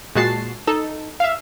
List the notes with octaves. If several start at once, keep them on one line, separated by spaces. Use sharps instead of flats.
A#2 G#3 F#4 A5 C7
D#4 A4
E5 F5